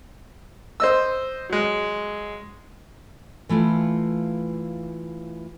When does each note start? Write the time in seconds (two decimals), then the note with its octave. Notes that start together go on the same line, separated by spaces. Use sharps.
0.80 C5 D#5 E6
1.49 F#3 G#3
3.49 E3 A3 E4 F4 F5